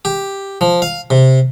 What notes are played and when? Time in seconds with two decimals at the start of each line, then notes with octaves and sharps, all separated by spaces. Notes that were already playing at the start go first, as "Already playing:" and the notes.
0.05 G4
0.61 F3
0.82 F5
1.10 C3